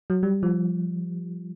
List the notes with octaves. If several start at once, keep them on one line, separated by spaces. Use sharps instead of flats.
F#3
G3
F3